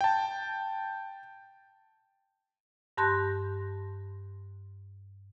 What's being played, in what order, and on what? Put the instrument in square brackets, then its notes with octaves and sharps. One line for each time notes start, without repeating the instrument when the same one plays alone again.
[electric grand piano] G5 A5
[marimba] G2 G4 A5 C6 F#6 A#6